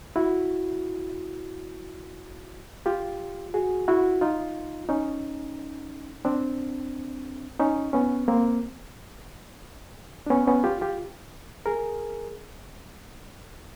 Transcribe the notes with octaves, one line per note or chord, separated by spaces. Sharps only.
E4 F#4
F4 G4
F#4 G#4
E4 F#4
D#4 F4
C#4 D#4
C4 D4
C#4 D#4
B3 C#4
A#3 C4
D4
B3 C#4
B3 C#4
F4 G4
F4 G4
G#4 A#4